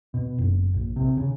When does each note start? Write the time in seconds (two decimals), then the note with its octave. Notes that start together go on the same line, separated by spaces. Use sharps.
0.14 B2
0.38 F#1
0.74 A#1
0.96 C3
1.17 C#3